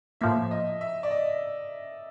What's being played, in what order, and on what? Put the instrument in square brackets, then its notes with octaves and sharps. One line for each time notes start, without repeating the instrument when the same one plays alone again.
[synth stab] A2 F3 A#3 [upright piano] E5
[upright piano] D#5
E5
D5
D#5